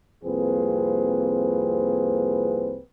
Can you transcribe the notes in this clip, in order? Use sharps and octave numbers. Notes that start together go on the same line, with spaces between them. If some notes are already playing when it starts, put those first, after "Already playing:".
C2 F2 A#3 C4 G#4 B4